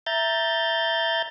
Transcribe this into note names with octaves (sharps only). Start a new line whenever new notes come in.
E5 A#5 G6 A6